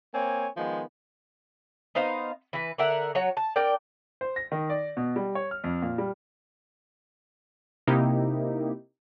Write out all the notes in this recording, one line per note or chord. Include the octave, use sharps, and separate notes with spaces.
A#3 C4 C#5 G#5
D#3 F3 G#3 B3
B3 D#4 C5 F5
E3 B4
D3 A#4 E5 F#5
F#3 F#4 C#5
A5
D4 A#4 D5 G5
C5
A#6
D#3
D5
B2
G3
C#5
F6
F2
A#2
G3
C3 A#3 D#4 E4 G4